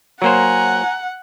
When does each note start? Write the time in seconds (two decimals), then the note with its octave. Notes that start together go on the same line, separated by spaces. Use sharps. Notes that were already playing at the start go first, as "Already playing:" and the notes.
0.22 F#3 A#3 C5 F#5 G#5 A#5